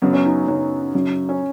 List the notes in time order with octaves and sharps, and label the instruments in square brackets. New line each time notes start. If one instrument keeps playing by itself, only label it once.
[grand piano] F#2 C#3 F#3 [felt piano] B3
[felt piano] C#4
D#4
[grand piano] F#2 C#3 F#3 [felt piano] D#4
[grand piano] F#2 C#3 F#3
[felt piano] C#4